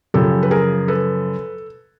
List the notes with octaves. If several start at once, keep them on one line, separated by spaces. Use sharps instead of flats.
F#2 C#3 F3 G4 A4
B4
G#4 A#4
A4 B4